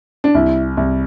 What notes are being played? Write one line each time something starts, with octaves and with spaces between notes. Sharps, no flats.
D4
C2 E4
C2